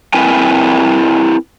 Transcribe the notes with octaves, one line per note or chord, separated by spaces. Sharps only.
C4 E4 A#4 B4 G5 G#5